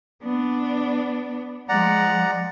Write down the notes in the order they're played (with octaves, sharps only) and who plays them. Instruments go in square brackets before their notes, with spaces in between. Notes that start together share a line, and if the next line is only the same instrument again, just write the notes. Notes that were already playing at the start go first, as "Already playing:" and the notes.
[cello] B3 D4
[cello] F3 G#3 [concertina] D5 F#5 A#5